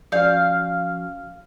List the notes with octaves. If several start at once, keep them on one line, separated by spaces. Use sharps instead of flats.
F3 C#4 F#4 D5 F5 G6